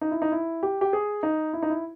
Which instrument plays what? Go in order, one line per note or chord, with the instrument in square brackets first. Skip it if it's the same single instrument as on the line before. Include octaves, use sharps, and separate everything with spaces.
[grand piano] D#4
E4
D#4
E4
G4
G4
G#4
D#4
E4
D#4
E4